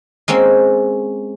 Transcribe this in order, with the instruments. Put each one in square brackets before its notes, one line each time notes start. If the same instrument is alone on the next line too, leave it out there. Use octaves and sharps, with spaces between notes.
[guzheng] G#3 A#3 C4 C#4